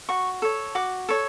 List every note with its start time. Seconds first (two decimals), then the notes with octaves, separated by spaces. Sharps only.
0.09 F#4 C#6
0.42 A4 C#5
0.75 F#4 D6
1.09 A4 C#5